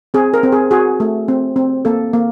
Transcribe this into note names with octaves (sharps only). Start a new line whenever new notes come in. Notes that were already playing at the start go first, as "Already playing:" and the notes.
C4 G#4
A#4
C4
G#4
F#4 G#4
A3
C4
C4
A#3 A4
A#3